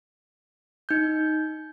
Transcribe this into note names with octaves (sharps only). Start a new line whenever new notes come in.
D#4 G6